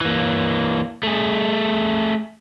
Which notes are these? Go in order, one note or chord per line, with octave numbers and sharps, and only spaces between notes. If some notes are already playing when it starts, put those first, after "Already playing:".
E3 A#3
A3 G#4